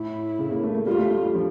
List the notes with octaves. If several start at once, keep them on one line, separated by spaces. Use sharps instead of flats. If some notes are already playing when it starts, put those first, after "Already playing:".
Already playing: A2 E4
C#3
A#3
A3
A3
G3 F4
A3
A3
G3
F3